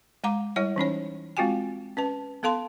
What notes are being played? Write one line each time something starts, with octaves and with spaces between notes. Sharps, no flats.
G#3 F#5 A#5 D6
G3 E4 C#5 F#5
E3 C#4 D#4 C#5
G#3 C4 F4 F#4 G5 G#5
C#4 B4 A5
B3 A4 F5 A5 C6